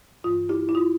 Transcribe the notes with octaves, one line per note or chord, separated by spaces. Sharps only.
G2 E3 F4
E4 G4
E4
F4